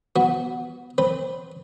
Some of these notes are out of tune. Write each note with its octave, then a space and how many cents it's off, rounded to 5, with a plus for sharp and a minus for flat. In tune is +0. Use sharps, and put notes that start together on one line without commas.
B3 +0 F#4 +0
C4 +0 B4 +0